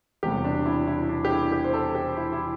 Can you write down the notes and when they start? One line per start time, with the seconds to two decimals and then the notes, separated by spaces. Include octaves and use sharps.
0.23 E1 E2 C3 G3 G4
0.44 D4
0.66 E4
0.87 E4
1.09 D4
1.25 G4
1.31 E4
1.52 G4
1.64 C5
1.74 A4
1.95 G4
2.17 E4
2.33 E4